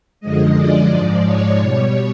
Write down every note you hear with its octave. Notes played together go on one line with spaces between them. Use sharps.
F#2 D3 F3 G#3 D#5
D5
G#2 F3 G#3
C#5
B2 G3